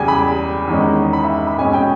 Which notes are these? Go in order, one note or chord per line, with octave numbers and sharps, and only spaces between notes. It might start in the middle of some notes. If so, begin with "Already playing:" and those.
Already playing: E2 C#3 G3 G5 G#5
B5
E2 D#3 G#3 C#4
B5
E5
B5
B2 G#3 C#4 G#5
G5